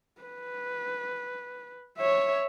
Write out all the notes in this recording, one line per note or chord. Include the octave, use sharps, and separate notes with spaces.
B4
C#5 E5